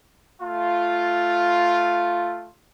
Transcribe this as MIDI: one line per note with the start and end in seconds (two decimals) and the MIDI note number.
0.42 2.50 57
0.42 2.50 65